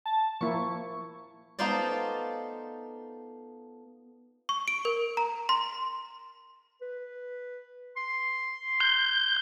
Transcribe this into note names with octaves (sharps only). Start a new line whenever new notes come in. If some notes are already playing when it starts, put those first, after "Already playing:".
A5
F3 A#3 E4 C#6
A3 B3 D#4 F4 C5 D5
C#6
D7
A#4
A#5
C6
B4
C6
G6